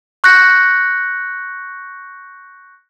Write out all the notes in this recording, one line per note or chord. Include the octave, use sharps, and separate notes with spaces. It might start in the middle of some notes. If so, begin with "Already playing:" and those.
C#6 F#6 G6 A#6 C#7